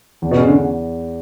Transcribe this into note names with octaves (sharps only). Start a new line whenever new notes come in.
E2
B2
C#3
D3
C#3